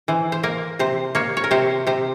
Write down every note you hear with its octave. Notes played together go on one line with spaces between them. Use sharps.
E3 C5
C5
A#3 A#4
C3 C5
A#3 C#5
C#5
A#4
C3 C5
C3 C5